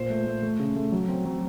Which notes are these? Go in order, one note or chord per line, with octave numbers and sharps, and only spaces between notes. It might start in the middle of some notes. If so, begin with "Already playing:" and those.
Already playing: A#2 C5
A3
A3
A3
C#3
A3
F#3
C4
F#3